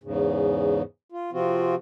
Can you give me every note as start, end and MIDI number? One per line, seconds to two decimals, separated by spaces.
0.04 0.82 40
0.04 0.82 44
0.04 0.82 49
1.12 1.31 65
1.33 1.75 48
1.33 1.75 53
1.33 1.75 60
1.33 1.75 65
1.33 1.75 66